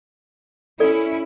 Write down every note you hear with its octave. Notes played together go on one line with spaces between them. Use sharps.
C#4 E4 A4 D5